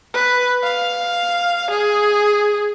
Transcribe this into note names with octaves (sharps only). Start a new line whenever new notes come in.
B4
F5
G#4